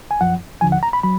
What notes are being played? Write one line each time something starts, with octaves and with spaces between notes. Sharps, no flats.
G#5
F#2 F3 F#5
D#2 D3 F3 G#5
F#5
A#5
B5
F#3 B5